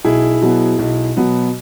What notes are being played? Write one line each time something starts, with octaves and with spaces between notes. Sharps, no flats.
B1 E4 G#4
B2 F#3 B3
B1
B2 F#3 B3